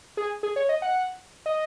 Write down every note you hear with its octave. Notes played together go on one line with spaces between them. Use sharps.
G#4
G#4
C#5
D#5
F#5
D#5